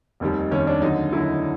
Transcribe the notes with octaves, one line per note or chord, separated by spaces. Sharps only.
F1 D#2 D#3 G3
F1 D#2 D#3 G3 C#4
D4
D#2 D3 F#3 D#4
D#2 D3 F#3 E4